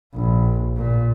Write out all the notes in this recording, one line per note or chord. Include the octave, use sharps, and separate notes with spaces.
A#1
A#2